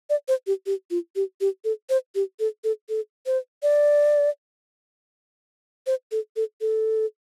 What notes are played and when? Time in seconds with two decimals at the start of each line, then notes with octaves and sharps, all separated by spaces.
0.10 D5
0.28 C5
0.47 G4
0.66 G4
0.91 F4
1.16 G4
1.41 G4
1.65 A4
1.90 C5
2.15 G4
2.40 A4
2.64 A4
2.89 A4
3.26 C5
3.63 D5
5.87 C5
6.12 A4
6.36 A4
6.61 A4